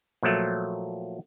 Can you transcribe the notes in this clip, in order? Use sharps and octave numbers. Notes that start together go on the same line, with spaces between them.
A#2 F3 F#3 A3